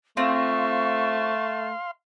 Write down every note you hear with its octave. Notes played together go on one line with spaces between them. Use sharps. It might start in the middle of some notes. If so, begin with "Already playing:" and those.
A3 C4 F4 F5 C6 C#6